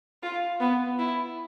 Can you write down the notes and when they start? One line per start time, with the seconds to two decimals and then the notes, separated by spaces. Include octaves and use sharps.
0.23 F4
0.60 B3
0.99 E4